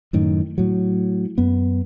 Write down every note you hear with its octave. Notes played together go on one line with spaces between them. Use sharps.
F#2 A2 D#3
A2 F#3
F#2 B3